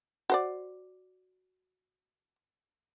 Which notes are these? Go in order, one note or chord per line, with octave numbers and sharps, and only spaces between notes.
F#4 C5 D5